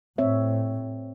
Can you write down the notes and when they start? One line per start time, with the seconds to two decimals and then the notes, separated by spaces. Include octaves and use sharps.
0.18 A2 C4 C#5 E5